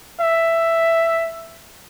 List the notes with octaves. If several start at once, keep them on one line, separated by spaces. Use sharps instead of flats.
E5